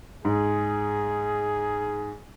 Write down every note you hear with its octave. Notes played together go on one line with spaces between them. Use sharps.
G#2 G#4